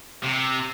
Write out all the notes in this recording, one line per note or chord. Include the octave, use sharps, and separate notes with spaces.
C3